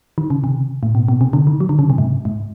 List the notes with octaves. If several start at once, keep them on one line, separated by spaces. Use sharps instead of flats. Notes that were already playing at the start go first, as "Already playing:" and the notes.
D#3
C#3
C3
A2
B2
B2
C3
D3
D#3
F#3
D3
C#3
C3
G#2
G#2